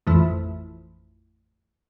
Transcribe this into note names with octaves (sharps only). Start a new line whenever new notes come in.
A1 F2 E3 A3